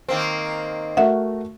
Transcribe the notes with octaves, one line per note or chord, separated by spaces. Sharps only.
D#3 A#3 C4
A3 F#4 A#4 E5 F#5